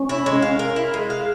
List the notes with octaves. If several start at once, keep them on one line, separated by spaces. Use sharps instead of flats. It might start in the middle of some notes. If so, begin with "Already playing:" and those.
Already playing: C#4
E4
G#3
F5
A#4
E4
G#3
F5